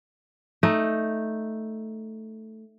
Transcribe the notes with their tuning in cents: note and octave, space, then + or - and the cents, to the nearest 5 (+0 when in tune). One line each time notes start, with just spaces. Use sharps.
A3 +0 D#4 +0